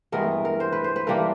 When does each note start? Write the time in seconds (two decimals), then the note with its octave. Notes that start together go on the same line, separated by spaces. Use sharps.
0.12 G2 E3 G#3 B3 A#4
0.45 A#4
0.60 C5
0.72 B4
0.84 C5
0.96 B4
1.07 E3 G3 A#3 D4 A#4